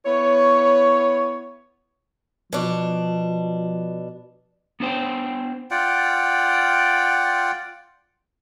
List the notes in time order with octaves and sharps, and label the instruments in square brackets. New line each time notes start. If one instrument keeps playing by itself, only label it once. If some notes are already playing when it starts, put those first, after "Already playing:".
[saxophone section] B3 E4 C#5
[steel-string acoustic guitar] B2 D4 [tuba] F3
[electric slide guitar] B3 D4 C5 G5
[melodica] F4 D5 F#5 G5